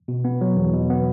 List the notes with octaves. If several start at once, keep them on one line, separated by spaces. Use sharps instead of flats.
B2
B3
F#3
E2
B2
B3